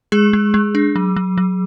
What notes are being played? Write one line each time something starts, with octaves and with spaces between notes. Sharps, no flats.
G#3 G#4
G#3
G#3
D4
F#3
F#3
F#3